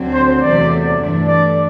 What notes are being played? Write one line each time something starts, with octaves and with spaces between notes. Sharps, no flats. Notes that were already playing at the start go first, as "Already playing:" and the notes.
Already playing: D2 D3 F#3 C4
C5
E2 C3 F#3 A3 D5
G2 E3 A3 D4
D5